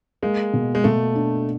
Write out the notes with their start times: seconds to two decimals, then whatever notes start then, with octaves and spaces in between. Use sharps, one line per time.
0.23 G#3 A#3
0.54 B2
0.75 G#3
0.84 B2 A3
1.16 D4